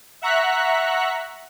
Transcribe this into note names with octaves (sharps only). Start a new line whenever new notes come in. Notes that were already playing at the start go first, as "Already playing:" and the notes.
E5 F#5 A#5 C#6 F#6 B6